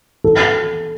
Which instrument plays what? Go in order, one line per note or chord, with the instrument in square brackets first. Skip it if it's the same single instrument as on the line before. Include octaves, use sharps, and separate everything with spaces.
[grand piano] A4